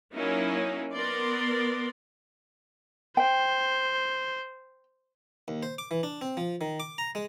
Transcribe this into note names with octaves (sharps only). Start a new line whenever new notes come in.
F#3 A#3 C#4 D#4 E4
B3 A#4 D5 C6
C5 G5
D#2
C5
D6
E3
D4
C4
F3
D#3
D6
A#5
G#3